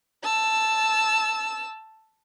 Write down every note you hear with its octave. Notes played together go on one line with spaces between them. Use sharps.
A5 E6